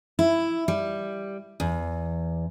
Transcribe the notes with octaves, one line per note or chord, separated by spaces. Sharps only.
E4
G3
E2